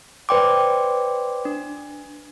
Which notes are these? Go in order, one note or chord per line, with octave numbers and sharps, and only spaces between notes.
B4 C5 D5 G5 C6 D6
D4